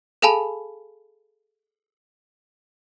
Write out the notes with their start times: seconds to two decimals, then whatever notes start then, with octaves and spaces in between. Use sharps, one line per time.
0.22 G#4 A4 F5 G#5 A5 B5